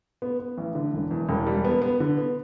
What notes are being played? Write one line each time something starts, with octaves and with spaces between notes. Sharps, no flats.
B3
B3
A1
D3
E1
E2
E1
G3
B3
B3
D3
B3